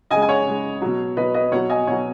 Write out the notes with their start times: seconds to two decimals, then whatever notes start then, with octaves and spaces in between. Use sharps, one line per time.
0.10 C#3 D#5 G#5
0.16 G#3
0.22 G#5
0.29 C#5 F#5
0.46 C#3 G#3
0.82 B2 F#3
1.17 B2 F#3 B4 D#5
1.34 B4 D#5
1.52 B2 F#3 C#5 F#5
1.70 D#5 G#5
1.87 B2 F#3 C#5 F#5